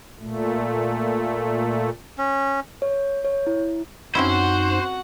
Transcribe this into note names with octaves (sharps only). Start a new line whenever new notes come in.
A#2 A3
C#4
C#5
C#5
E4
F#2 C4 C#4 D#4 E4 F#4 C5 F#5